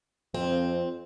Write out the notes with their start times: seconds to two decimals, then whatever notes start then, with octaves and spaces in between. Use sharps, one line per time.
0.34 F2 C4